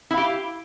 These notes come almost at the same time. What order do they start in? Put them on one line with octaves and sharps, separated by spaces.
E4 F5 G4